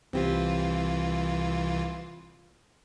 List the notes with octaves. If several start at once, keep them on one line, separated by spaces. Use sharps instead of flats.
C2 E3 C4 F4 G4